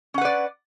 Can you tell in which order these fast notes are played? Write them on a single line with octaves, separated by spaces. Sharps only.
C#4 F#5 B4 D5